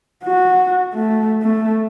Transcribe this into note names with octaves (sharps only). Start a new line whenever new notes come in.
F#4
A3
A3